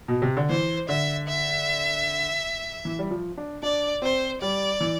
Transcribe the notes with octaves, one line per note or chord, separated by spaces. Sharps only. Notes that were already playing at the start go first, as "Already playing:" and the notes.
B2
C3
D3
E3 C5
D3 E5
E5
E3
G3
F3
D4
D4 D5
C4 C5
G3 D5
E3